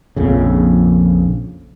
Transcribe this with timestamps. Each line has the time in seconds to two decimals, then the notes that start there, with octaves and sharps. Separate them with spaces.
0.16 A#1 F2 C#3